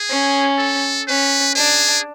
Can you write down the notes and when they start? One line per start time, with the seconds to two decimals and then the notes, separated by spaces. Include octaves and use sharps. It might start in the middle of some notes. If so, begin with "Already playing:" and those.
Already playing: G#4
0.10 C#4
0.58 A4
1.07 C#4 B4
1.55 D4 G#4